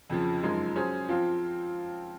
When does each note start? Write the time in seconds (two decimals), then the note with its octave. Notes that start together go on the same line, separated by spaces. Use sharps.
0.10 F2 C#3 F3
0.43 F#2 F3 G#3 D#4
0.75 F#3 C#4 G#4 C5
1.09 F3 C4 F4